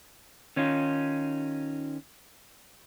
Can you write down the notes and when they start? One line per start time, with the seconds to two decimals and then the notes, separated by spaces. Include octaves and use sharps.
0.56 D#3 C#4 D#4 F4